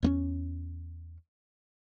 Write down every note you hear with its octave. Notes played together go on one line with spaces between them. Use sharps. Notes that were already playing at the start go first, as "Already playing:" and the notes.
E2 A#3 C#4